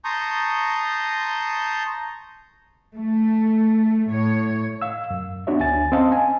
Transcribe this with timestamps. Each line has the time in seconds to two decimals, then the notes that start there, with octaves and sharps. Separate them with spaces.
0.05 A5 A#5 C6 C#6 D#6 G6
2.97 A3
4.10 A2 C#5
4.82 F5 E6
5.10 F#2
5.47 B3 D4 F#4 C#5 E5
5.60 D2 G#5 A6
5.92 C4 C#4 D#5 F5 A5
6.12 G#5